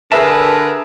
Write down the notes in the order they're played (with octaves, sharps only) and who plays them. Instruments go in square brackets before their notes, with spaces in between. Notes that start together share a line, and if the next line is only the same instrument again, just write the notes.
[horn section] D3 B4 [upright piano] G#4 E5 [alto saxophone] A#4 [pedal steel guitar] A5 E6